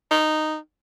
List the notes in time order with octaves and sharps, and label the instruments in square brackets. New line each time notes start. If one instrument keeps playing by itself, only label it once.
[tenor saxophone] D#4